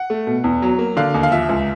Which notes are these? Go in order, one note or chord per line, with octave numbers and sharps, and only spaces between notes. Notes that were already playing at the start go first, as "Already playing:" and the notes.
Already playing: F#5
A3
B2
E2
F#3
A#3
D3 F5
D#2
F5
F3 E5
C#2